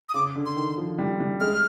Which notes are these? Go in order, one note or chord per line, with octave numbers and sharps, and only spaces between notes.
D#6
C#3 D6
D3
C6
D#3
F3
G3
G3
G#3 F6